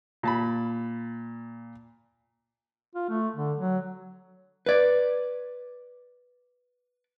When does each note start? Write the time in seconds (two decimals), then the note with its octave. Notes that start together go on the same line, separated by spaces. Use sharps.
0.23 A#2 A5 B5
2.95 F4
3.09 A3
3.36 D3
3.57 F#3
4.66 B4 D5